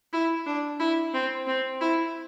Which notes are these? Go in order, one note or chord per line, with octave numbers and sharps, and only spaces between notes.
E4
D4
E4
C4
C4
E4